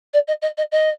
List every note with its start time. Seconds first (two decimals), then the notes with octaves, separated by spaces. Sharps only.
0.13 D5
0.28 D#5
0.42 D#5
0.57 D#5
0.72 D#5